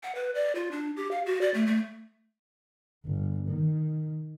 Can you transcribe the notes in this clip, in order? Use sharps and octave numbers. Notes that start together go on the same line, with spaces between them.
F#5
B4
D5
F4
D4
G4
F5
F#4
D5
A3
A3
G1
D#3